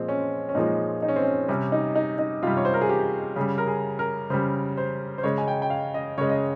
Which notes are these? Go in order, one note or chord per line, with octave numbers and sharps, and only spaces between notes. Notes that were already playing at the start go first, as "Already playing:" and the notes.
Already playing: A#2 F3 G#3 C4
C#4
C#4
A#2 F3 G#3 D#4
D#4
C#4
C4
C#4
C3 G3 C#4
D#4
D#4
D#4
C3 G3 F4
C#5
C5
A#4
G#4
G4
C#3 G3 G#4
A#4
G#4
A#4
C#3 G3 C5
C5
C5
C#3 G#3 C#5
G#5
G5
G5
F5
D#5
C#3 G#3 C#5
D#5